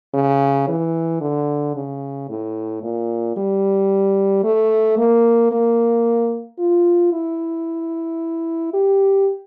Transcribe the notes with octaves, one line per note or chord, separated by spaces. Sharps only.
C#3
E3
D3
C#3
A2
A#2
G3
A3
A#3
A#3
F4
E4
G4